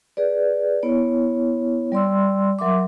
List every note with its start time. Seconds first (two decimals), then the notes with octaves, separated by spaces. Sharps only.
0.17 G#4 B4 D5
0.83 B3 E4 C#5
1.92 G3 D5 C6 E6
2.59 F#3 A#4 E5 C6 D6